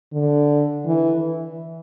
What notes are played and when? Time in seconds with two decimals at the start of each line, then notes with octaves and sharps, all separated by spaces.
0.12 D3
0.86 E3